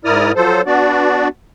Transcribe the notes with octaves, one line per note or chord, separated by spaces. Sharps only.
G#2 E4 A#4 D5 D#6 F6
F3 F#3 A4 C5
B3 D4 F#4 D5